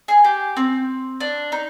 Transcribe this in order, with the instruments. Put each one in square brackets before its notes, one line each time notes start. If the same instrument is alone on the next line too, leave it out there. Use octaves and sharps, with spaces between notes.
[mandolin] G#4
G4
C4
D4
D#4